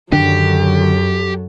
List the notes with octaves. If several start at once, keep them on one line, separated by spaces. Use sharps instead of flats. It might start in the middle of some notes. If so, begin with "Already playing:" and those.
F#2 D3 D#3 F#3 D4 G4 A4